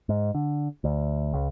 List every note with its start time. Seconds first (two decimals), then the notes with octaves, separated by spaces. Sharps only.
0.09 G#2
0.35 D3
0.84 D2
1.33 C#2